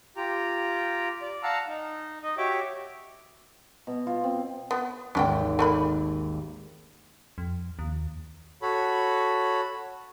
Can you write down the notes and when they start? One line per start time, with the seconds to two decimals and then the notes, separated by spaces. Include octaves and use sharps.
0.17 F4 G4 G5 A#5
1.22 D5
1.43 F5 F#5 A5 A#5 E6
1.67 D#4
2.23 D#4 D#5
2.38 F#4 G4 C#5 E5 G5 D6
3.87 B2
4.07 F4
4.24 C4
4.71 B3
5.15 G#1 D#2 C#4 D5 G5
5.59 A3 A#3 B5
7.38 F2
7.79 D#2
8.62 F#4 A4 C#5 B5